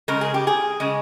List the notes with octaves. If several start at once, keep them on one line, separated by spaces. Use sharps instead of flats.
C#3 G#3 A#4
G#4
G4
G#4
C#3 G#3